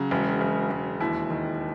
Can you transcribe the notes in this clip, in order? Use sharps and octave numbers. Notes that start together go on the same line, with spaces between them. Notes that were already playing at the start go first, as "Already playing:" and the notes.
Already playing: C#3 F#3
E1
E1
E1
D#2 E4
D#3